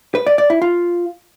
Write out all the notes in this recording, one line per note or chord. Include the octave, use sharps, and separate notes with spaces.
B4
D5
D5
E4
F4